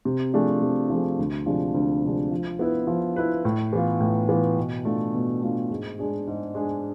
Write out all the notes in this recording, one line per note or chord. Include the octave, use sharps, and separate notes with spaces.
C3
F3 A3 D4 G#4
C3
F3 A3 D4 G#4
D2
C3 F3 G#3 D4
D2
C3 F3 G#3 D4
F3
B3 E4 B4
F3
B3 E4 B4
A2
E3 B3 F4
A2
E3 B3 F4
B2
A3 D4 F4
B2
A3 D4 F4
G#2
G#3 D4 G#4
G#2
G#3 D4 G#4